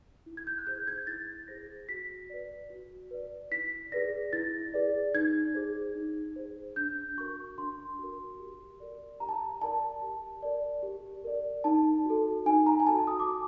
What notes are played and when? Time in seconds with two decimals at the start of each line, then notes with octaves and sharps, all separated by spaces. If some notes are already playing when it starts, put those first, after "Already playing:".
0.26 E4
0.37 G#6
0.47 G6
0.58 F#6
0.67 G#4 C5 G6
0.87 G#6
1.07 E4 A6
1.48 G#4 C5 A#6
1.89 F#4 B6
2.30 B4 D5
2.70 F#4
3.11 B4 D5
3.51 E4 B6
3.92 G#4 B4 D5 A#6
4.33 E4 A6
4.74 G#4 B4 D5
5.14 D#4 G#6
5.55 G#4 C5
5.95 D#4
6.36 G#4 C5
6.76 D4 G6
7.17 F#4 A#4 C#6
7.58 D4 C6
7.99 F#4 A#4
8.39 G4
8.80 A#4 D5
9.20 G4 A#5
9.29 A5
9.36 A#5
9.61 A#4 D5 A5
10.02 G4
10.43 A#4 D5
10.83 G4
11.24 A#4 D5
11.64 D#4 A5
12.05 F#4 A4
12.46 D#4 G#5
12.66 A#5
12.80 G#5
12.87 F#4 A4 A5
13.07 D#6
13.20 D6
13.27 F#4